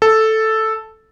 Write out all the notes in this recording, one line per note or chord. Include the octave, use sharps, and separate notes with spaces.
A4